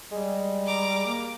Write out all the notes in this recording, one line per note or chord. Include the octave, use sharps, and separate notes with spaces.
G3 G#3
A#5 D6
A#3